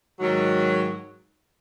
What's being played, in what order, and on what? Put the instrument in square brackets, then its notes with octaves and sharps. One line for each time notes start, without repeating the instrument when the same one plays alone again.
[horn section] G#2 D#3 F#3